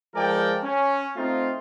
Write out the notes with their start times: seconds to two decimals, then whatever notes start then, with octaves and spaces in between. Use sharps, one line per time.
0.15 F3 G#3 A4 A#4 D5 G5
0.64 C#4
1.16 A3 C4 D#4 F4